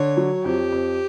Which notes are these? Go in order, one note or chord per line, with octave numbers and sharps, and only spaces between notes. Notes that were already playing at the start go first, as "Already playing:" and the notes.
Already playing: D3 C#5
F#3
F2 G4
F2